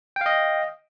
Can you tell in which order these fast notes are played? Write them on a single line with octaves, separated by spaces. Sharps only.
G5 F5 D#5